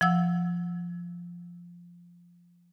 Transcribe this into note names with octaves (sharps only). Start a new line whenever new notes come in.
F3 F#5 E6